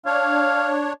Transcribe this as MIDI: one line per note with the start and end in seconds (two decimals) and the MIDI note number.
0.06 0.93 62
0.06 0.93 73
0.06 0.69 77